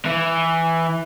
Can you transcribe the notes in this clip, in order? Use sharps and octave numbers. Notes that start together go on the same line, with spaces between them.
E3